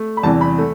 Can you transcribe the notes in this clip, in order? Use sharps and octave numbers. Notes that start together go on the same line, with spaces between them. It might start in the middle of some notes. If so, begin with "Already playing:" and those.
Already playing: A3
B5
E2 C3 E3 G3 A5
B5
A3